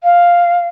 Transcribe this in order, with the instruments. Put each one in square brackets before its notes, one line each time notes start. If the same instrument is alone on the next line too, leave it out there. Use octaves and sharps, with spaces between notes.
[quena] F5